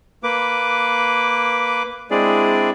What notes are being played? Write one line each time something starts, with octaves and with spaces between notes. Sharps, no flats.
A#3 B4 D6
G#3 C4 D4 E4 G#4 D5